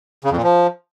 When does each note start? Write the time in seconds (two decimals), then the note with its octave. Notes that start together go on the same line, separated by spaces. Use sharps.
0.24 C#3
0.31 F2
0.37 A#2
0.43 F3